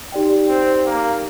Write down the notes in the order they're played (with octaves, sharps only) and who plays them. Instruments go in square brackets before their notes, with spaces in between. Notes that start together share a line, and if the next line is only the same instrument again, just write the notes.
[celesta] D#4 G4 D5 G5
[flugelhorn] C4
A#3